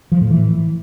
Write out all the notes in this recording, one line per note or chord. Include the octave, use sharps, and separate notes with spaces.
F3
A2
E3